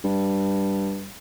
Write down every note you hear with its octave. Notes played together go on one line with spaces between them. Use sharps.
G2